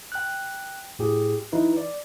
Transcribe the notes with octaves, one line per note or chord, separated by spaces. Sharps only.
G5 F#6
A2 G4 G#4
E3 D#4 E4 B4
D5